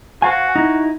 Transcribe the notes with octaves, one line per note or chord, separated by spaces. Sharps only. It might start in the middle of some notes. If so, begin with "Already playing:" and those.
F#4 C5 F5 G#5
D#4 E4